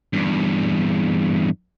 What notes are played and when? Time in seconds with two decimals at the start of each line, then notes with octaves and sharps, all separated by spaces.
0.13 E2 G2